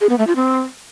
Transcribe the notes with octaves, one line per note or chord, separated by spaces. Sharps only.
G#4
B3
A3
F4
C4